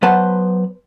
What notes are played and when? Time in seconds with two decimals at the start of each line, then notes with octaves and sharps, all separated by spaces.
0.02 F#3 B3 B4 C5 F#5 A5